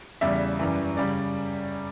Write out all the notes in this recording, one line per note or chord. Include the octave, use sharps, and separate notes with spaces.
E2 C#3 G3 E5
F#2 E3 G3
C#3 G3 D5